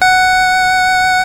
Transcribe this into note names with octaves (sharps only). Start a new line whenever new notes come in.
F#5